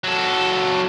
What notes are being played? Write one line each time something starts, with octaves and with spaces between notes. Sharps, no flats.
F#3 A4